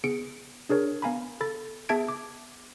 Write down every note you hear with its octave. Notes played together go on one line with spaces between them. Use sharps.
B3 G#4 C#7 D7
D4 G#4 A#4 C#5
B3 F5 G#5 A#5 B5
A4 B5 A6
B3 G#4 E5 A5 G#6 D7
D6